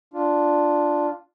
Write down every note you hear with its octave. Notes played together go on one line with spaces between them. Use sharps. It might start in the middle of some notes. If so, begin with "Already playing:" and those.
D4 F4